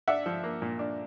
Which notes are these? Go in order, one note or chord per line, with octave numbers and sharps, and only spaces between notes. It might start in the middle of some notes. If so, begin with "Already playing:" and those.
D4 E5 F#5
F3
A#3
A#2
D4